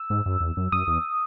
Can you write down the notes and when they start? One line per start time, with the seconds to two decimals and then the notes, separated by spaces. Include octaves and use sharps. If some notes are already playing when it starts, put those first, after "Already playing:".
Already playing: E6
0.10 G#2
0.26 F#2
0.41 E2
0.57 F#2
0.72 F#2 D#6
0.87 E2